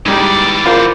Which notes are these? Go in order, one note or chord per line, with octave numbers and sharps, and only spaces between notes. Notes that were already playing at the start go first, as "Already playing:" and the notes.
G#2 E3 G3 D#4 D5
F4 A#4 C5